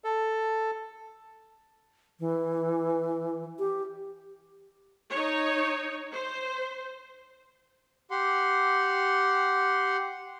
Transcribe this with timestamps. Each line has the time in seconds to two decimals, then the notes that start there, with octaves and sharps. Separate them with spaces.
0.04 A4
2.20 E3
3.59 G4
5.11 D#4 C#5
6.13 C5
8.11 G4 F#5 C6